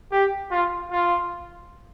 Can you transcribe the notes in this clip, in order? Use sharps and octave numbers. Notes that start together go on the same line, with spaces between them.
G4
F4
F4